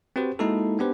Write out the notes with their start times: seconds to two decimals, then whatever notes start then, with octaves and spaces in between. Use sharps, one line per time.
0.16 C4 F#4 G4 B4 C5
0.39 G#3 A#3 D#4 E4 F#4 A4
0.79 B3 D4 G4 B4 C5